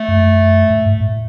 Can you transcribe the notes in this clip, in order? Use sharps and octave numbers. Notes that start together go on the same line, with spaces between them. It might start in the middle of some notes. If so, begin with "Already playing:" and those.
Already playing: A3
F#2
G#2
G#2
A2